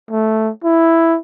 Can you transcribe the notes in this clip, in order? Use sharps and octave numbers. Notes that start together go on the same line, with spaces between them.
A3
E4